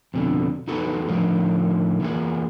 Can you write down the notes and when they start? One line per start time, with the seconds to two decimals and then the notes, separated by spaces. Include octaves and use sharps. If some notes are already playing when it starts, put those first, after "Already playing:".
0.14 F2 B2 D3
0.68 E2 D#4 F#4 A4 B4
1.07 A2 D3 D#3 F3
2.01 E3 A#3 G#4